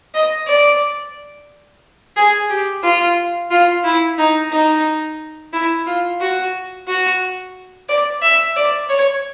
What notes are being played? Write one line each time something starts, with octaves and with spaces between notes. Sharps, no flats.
D#5
D5
G#4
G4
F4
F4
E4
D#4
D#4
E4
F4
F#4
F#4
D5
E5
D5
C#5